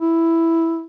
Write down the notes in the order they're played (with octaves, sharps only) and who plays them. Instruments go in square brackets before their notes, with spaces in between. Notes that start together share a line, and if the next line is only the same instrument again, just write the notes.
[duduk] E4